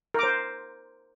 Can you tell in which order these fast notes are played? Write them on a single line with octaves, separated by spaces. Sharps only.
A#4 D6 C5